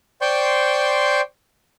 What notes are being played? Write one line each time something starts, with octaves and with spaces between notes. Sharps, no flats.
C5 D5 G5 C6 C#6 G6